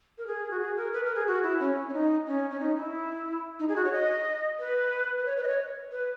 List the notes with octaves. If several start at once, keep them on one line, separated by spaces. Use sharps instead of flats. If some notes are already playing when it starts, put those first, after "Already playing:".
A#4
G#4
F#4
G#4
A#4
B4
A#4
G#4
F#4
E4
C#4
C#4
D#4
C#4
C#4
D#4
E4
D#4
G#4
F#4
C#5
D#5
B4
B4
C#5
B4
D#5
C#5
B4